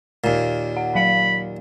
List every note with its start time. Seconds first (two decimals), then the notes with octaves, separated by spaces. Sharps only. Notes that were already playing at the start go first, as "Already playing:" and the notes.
0.24 D#2 A#2
0.77 F#5
0.95 F#3 F5 B5